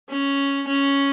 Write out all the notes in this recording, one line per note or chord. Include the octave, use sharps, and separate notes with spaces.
C#4
C#4